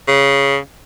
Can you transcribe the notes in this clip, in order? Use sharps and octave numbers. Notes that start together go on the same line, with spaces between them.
C#3